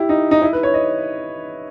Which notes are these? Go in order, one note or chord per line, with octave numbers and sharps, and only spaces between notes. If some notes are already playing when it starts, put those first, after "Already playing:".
Already playing: E4 G4
D#4
D#4
E4
B4
C#5
D#5